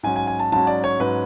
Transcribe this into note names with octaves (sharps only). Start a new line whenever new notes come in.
G#2 F#3 C#4 G#5
G#5
G#5
A5
G#2 F#3 C#4 A5
D5
C#5
G#2 F#3 C#4 B4